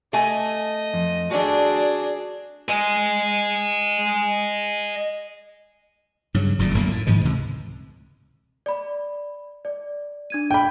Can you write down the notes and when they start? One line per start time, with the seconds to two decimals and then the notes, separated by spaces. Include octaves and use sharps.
0.13 A3 D#5 G#5
0.94 F2
1.31 D4 F#4 G#4 D5
2.69 D#5 G#5
6.34 G2 C#3 F#3
6.59 D#1 F#2 A#2 G3
6.74 G1 F#2 D3 A#3
6.91 A2
7.07 G#2 D#3 F3 G#3
7.24 C#2 C3 E3
8.66 D5 B5
9.65 D5
10.30 D4 G#6 D#7
10.51 G5 B5